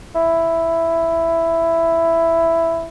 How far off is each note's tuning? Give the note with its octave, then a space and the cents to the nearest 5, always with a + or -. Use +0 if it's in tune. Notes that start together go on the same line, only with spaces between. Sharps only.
E4 +5